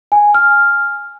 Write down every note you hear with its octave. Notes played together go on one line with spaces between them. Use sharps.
G#5
F6